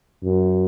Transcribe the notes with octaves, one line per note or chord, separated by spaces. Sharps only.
F#2